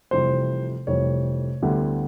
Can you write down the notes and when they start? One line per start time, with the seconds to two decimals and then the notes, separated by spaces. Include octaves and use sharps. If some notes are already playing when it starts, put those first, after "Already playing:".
0.11 F1 F2 C3 E3 G3 C5
0.87 F1 F2 C3 E3 G3 C#5
1.62 D2 D3 G3 B3 E4